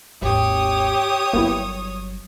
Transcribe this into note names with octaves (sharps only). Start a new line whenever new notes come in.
G#1 D#2 G4 C#5 D#6
G1 F#3 A#3 B3 E4